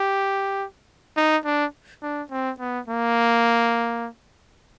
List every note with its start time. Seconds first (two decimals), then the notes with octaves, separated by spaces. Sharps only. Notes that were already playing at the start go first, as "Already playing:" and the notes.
Already playing: G4
1.17 D#4
1.46 D4
2.02 D4
2.31 C4
2.60 B3
2.88 A#3